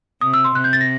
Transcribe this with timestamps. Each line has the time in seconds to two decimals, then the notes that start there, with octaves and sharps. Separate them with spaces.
0.21 C3 D#6
0.34 E6
0.44 C6
0.55 C3 F#6
0.64 G6
0.73 A6
0.81 A#6